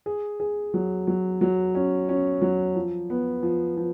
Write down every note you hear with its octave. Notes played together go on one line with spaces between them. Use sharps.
G#4
G#4
F#3
F#3
F#3
C#4
C#4
F#3
F3
B3
F3
F3